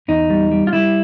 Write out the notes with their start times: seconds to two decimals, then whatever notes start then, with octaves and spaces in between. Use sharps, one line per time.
0.08 E2 D#4
0.30 G3
0.51 G3
0.67 F4
0.73 G3 E4